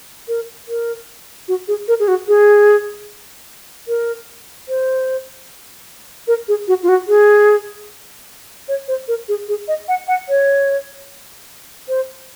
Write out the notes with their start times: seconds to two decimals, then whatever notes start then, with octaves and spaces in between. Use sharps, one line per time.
0.28 A#4
0.68 A#4
1.48 F#4
1.68 G#4
1.88 A#4
1.99 G#4
2.08 F#4
2.28 G#4
3.88 A#4
4.69 C5
6.28 A#4
6.48 G#4
6.68 F#4
6.83 F4
6.89 F#4
7.08 G#4
8.68 C#5
8.88 C5
9.08 A#4
9.28 G#4
9.48 G#4
9.68 D#5
9.88 F#5
10.08 F#5
10.29 C#5
11.88 C5